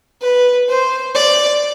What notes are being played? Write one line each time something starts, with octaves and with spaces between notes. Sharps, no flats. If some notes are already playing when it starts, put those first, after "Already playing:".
B4
C5
D5